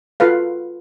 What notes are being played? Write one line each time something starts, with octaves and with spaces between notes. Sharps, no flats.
F4 F#4 A4 B4 F5